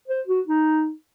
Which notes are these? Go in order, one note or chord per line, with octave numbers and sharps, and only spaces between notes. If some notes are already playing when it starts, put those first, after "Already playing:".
C5
F#4
D#4